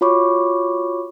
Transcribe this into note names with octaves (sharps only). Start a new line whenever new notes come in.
F4 F#4 C#5 B5 C#6 D6